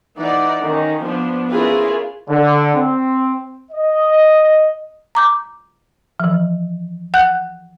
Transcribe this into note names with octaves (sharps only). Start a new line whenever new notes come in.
E3 D#4 D5 F#5
D#3 C#4
F3 B3 D4
C#4 E4 F4 G#4 A#4 B4
D3
C4
D#5
A#5 D6 G6
E3 F3
F#5 F#6 G6